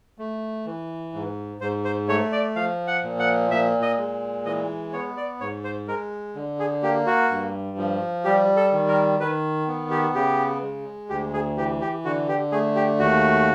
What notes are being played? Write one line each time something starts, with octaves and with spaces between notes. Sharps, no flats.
A3
E3
G#2
G#2 C5
C5
A3 C#5
D5
F3 F5
F#5
A#2
F#5
A#2 E5
D#5
G#3
E3 D#5
B3 C#5
D5
G#2 C#5
C5
G#3 A#4
D3
G#4
A#3 G4
F#4
G2
F3
G3 G4
A4
D#3
A#4
D#3 B4
B3
G4
C#3 G4
G#3
D2 G4
G#4
E3 G4
G4
D3 F#4
G4
A3 G#4
G4
D#2 F#4